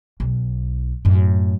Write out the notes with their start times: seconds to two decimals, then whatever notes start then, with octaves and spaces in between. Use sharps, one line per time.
0.20 B1
1.05 F#2 A2